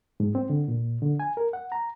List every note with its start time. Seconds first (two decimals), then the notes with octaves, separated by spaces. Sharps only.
0.20 G#2
0.35 C4
0.50 D3
0.68 A#2
1.02 D3
1.20 G#5
1.37 A#4
1.53 F#5
1.72 A#5